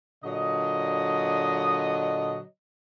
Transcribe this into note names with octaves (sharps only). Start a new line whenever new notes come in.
A#2 D3 F#3 D#5